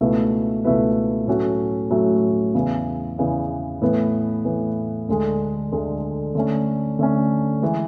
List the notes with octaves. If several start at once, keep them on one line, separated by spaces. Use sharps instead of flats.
C#2 B2 A3 E4 B4
C#2 B2 A3 E4 B4
A2 F#3 A3 C#4 F#4
A2 F#3 A3 C#4 F#4
E2 C#3 E3 B3
E2 C#3 E3 B3
A2 E3 B3
A2 E3 B3
D2 D3 G#3
D2 D3 G#3
D3 A3 C#4
D3 A3 C#4
E3 G#3